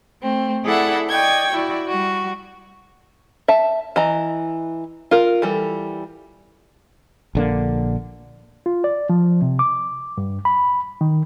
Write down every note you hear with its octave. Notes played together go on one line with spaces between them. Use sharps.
A3 C4
E4 G#4 A4 D5 E5 F#5
D5 D#5 G5 C#6 G#6
E4 F#4 D5
G3 F#4
E5 A5
E3 D#5 A#5
F4 A#4
E3 G3 A4
A#1 D3 A#3
F4
D5
F3
C3
D6
G2
B5
D#3